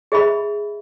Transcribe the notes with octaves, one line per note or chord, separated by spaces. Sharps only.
G#4 D#5 E5 B5